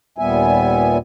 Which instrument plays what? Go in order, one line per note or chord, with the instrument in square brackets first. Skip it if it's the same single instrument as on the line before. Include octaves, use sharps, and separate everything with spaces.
[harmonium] D#2 A#2 G3 B3 E5 G#5